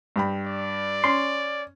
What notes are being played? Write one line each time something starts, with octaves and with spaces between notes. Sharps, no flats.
G2 G5 B5
D5
C#4 C6